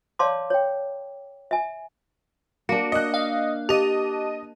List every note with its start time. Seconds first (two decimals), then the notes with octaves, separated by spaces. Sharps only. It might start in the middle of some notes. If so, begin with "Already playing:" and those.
0.19 C#5 D5 F5 A5 C6 D6
0.50 C#5 G5
1.51 E5 G#5
2.69 A#3 D4 F#4 C#7
2.92 D#5 F#6
3.14 F5
3.69 G4 D#5 A5 D#7 F7